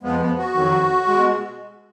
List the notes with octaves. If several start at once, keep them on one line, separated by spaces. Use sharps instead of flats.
F2 F3 G#3 B3
B3
F#4
F2 D#3 F#3
B2 G#3